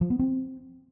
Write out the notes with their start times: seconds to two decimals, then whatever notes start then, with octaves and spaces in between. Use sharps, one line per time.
0.01 F3
0.10 B3
0.19 C4